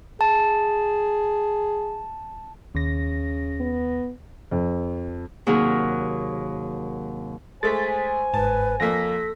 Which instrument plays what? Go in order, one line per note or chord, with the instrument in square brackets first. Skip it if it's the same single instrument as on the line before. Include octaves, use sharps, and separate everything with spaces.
[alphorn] G#4 [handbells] A5
[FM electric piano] D#2 A#6 [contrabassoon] C#3
[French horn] B3
[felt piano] F2
[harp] D#2 C3 F#3 G#4 A#4
[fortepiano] G#3 A3 [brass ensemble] C5 G#5 [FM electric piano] A6 B6
[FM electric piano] G1 G#2 [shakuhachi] B4 [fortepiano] A5
[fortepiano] F2 A#3 [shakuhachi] A4 [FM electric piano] A#6 B6